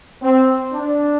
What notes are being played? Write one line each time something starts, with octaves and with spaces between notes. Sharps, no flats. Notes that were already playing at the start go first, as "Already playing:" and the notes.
C4
D4